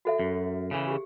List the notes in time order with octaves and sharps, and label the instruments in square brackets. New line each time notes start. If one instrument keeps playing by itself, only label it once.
[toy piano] F#4 A4 E5
[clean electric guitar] F#2
C#3 E3
[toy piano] G4 G#4